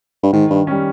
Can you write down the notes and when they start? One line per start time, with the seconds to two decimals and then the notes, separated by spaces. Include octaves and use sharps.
0.23 G2
0.33 G#2 D#3
0.50 G2
0.67 G3 C#4